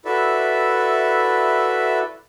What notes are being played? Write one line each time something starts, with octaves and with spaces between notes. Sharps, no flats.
E4 F#4 A4 B4 D5 E5